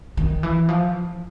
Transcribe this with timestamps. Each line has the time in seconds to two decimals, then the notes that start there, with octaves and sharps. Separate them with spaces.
0.17 D#3
0.43 E3
0.69 F3